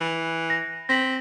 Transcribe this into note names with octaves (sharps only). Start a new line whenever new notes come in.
E3
A#6
C4 A#6 B6 F#7